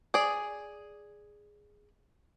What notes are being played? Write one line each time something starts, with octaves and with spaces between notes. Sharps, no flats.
G#4 D5